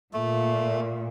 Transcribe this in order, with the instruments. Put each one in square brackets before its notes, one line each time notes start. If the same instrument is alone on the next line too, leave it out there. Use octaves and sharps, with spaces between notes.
[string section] A#2 [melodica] A3